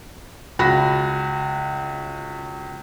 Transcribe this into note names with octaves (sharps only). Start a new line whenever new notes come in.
C#2 F#4 B5 A#6